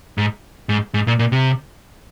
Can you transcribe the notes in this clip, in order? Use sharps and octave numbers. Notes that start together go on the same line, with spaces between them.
G#2
G#2
G#2
A#2
A#2
C3